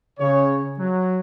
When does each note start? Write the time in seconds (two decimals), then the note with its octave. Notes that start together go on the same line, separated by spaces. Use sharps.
0.19 C#3 C#5
0.77 F#3